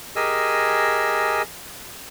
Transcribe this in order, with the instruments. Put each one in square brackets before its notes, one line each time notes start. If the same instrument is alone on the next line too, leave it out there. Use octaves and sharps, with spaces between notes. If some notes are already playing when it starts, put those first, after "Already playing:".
[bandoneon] G4 G#4 A#4 D#5 G#5 E6